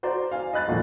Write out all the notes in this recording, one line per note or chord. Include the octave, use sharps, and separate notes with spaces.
F#4 C5 D5 A#5
F5 G#5
D#5 B5 F#6 A6
G#1 F2 A#2